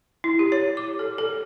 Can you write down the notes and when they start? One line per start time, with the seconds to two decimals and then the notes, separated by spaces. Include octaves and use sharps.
0.24 E4
0.39 G4
0.52 C#5
0.77 D6
0.99 A4
1.18 A4